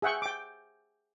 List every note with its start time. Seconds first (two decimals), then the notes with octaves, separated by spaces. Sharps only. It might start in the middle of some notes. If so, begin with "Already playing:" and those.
0.02 G#4 E5 F#5 G5 C#6
0.22 G5 D6